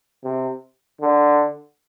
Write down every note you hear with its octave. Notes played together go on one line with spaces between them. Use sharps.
C3
D3